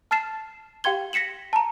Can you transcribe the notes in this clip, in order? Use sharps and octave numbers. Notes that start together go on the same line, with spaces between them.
A5 F6 A6 C7 E7
G4 F5 G5 C6 G#6 G7
A#6 B6 C#7 E7 F#7
A5 A#5